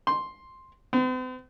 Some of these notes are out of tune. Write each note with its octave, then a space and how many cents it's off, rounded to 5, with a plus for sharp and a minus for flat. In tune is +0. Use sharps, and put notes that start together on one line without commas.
C6 +5
C4 -45